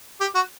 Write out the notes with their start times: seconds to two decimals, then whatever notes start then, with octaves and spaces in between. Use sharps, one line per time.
0.21 G4
0.35 F#4